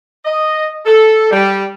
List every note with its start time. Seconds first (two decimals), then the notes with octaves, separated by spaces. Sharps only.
0.25 D#5
0.85 A4
1.31 G3